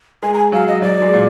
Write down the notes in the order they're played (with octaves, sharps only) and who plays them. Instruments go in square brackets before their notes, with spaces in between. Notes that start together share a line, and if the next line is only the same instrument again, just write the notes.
[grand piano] G#3 [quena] G#5
[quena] A#5
G#5
[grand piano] F#3 [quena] F5
[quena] D#5
[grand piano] F#3 [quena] D5
[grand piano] G#3
A#2